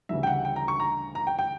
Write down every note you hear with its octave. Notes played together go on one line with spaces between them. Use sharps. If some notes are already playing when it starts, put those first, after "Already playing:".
D2 C#3 E3 G3 E5
G5
F#5
G5
A#5
C#6
A#5
A#5
G5
G5